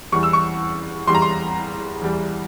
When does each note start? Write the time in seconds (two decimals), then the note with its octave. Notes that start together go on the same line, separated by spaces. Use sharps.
0.12 E2 E3 G3 C#6
0.23 E6
0.33 C#6
1.07 E2 E3 G3 C6
1.15 A#5
1.22 C6
2.01 E2 E3 G3